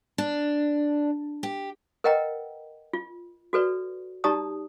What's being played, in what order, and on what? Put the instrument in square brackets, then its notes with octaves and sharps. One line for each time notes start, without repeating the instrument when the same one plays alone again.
[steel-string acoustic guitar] D4
G4
[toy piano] A#4 B4 D#5 F#5 G5 A#5
F4
F#4 A4 B4 D5
D#4 G4 D5 A5 A#5 D#6